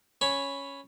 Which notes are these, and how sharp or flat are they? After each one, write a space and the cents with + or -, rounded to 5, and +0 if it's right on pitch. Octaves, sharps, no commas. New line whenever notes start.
C#4 +0 C#5 +0 B5 +0